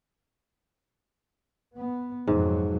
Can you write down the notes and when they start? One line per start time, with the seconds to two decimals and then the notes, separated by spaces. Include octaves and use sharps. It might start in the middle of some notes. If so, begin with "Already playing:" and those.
1.76 B3
2.27 F2 G#2 B2 F#3